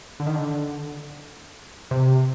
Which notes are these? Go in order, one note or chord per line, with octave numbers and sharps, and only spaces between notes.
D3
D#3
D3
C3